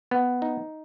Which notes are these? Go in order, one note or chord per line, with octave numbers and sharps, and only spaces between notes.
B3
D#4